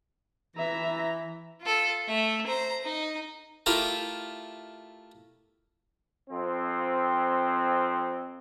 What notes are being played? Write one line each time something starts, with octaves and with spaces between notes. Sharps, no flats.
E3 E5 A#5
F4 A4
A3 E5
C5 A#5
D#4
A3 E4 F4 G4 A#4
F2 C4